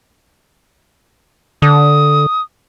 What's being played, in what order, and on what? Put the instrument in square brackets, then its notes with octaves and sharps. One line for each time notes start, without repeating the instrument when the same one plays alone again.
[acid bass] D3 [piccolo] D#6